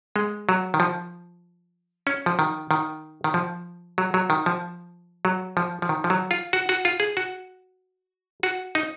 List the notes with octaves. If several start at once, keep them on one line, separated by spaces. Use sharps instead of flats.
G#3
F#3
D#3
F3
C#4
F3
D#3
D#3
D#3
F3
F#3
F#3
D#3
F3
F#3
F3
F3
D#3
F3
F#3
F4
F#4
F#4
F4
G#4
F#4
F#4
D#4